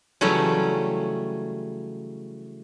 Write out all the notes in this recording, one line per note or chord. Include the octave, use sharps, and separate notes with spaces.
C#3 E3 F#3 G3 A3 C#4